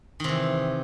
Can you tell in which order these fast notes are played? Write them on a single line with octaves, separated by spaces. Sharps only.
D#3 C3 E3